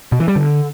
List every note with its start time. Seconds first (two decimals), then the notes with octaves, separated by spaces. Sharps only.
0.12 B2
0.20 E3
0.28 G3
0.36 D3